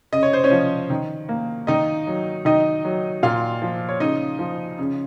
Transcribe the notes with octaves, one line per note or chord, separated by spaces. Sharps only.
C#3 D#5
C#5
C5
C#4 C#5
F3
D#3
A#3
D#3 D#4 D#5
F#3
D#3 D#4 D#5
F#3
A#2 F4 F5
F3
C#5
C#3 D#4 D#5
F3
C#3